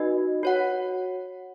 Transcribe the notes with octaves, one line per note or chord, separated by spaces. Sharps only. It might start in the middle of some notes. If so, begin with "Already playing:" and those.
Already playing: D#4 F#4 B4 D#5
F#4 C#5 F#5